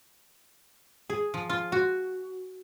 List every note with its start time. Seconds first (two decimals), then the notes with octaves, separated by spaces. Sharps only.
1.10 G#4
1.34 F3
1.50 F4
1.72 F#4